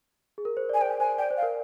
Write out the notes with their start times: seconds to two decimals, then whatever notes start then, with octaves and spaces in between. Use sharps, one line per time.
0.38 G#4
0.45 A#4
0.57 C5
0.69 D5 G#5
0.81 C5 G5
1.00 C5 G#5
1.18 D5 G5
1.30 C5
1.37 F5
1.43 A#4